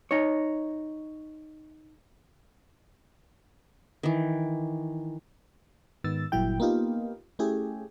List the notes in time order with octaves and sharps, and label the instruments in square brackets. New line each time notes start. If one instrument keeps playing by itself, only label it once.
[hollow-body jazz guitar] D#4 C#5
[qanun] D#3 E3
[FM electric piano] G#2 D#3 B3 E6 A6
G1 G2 A#2 F#3 E4 G5
A#3 B3 D#4 F4 G4
A3 C#4 E4 G4 G#4